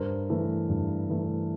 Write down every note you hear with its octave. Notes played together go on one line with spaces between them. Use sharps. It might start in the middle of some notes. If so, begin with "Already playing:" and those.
Already playing: G2 A#4 C5
E3 A3
G2
E3 A3